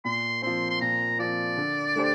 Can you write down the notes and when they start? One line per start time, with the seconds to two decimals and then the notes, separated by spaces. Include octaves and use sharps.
0.05 A#2 C6
0.42 F3 C4 C6
0.69 C6
0.81 A#2 A#5
1.19 F3 C4 D5
1.57 D3
1.96 A3 D4 G4 C5